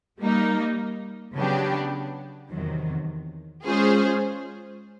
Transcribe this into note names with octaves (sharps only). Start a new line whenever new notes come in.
G3 A#3 D#4
C#3 F#3 B3 D4 G4
E2 C3 D#3 F#3
G#3 C#4 F4 G#4 C5